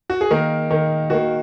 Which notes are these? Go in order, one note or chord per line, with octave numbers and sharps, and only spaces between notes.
F#4
G#4
D#3 A#3 A#4
D#3 A#3
D#3 A#3 F#4